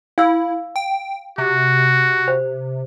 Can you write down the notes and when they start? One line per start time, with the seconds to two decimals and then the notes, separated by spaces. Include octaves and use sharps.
0.18 E4 F5 E6
0.76 G5
1.38 C3 F#4
2.28 C5